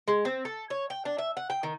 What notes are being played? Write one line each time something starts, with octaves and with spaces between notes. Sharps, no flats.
G#3
C4
A4
C#5
G5
D4
E5
F#5
G5
D#3